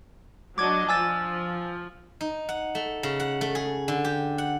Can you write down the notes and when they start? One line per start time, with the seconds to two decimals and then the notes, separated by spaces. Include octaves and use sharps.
0.58 F#3 D4 D#5 D6 G#6
0.89 F3 G#5 E6 A6
2.21 D#4
2.49 F#5
2.75 A3
3.03 C#3
3.20 F#5
3.41 A3
3.55 G#4
3.88 D3
4.05 G4
4.38 F#5